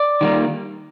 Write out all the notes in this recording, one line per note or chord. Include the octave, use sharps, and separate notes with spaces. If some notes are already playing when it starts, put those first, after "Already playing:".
Already playing: D5
D#3 G3 A#3